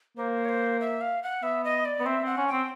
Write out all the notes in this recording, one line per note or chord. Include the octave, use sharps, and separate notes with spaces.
A#3 C5
C#5
C5
E5
F5
F#5
B3 E5
D#5
D5
B3
C4 E5
C4 F#5
C#4
C4 G5